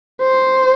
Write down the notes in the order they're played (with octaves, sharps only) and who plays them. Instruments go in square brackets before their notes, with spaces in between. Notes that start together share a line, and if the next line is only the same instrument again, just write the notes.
[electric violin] C5